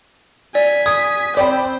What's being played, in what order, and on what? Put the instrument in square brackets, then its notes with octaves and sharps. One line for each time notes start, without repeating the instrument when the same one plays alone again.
[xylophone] D5 [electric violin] G#5 B6
[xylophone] D#6 [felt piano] G#6
[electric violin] C4 C5 [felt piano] D5 G5 B5